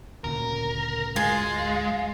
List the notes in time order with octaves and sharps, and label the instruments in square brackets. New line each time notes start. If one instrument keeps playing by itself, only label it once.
[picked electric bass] D2 A#2 C#3 [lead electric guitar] A#4
[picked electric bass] D2 G#2 [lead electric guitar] G#3 [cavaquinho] F4 G#5 [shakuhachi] F5